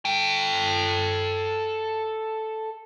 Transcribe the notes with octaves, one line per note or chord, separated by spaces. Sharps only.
A4 G5